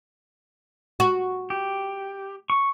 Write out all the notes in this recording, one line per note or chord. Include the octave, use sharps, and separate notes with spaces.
F#4
G4
C#6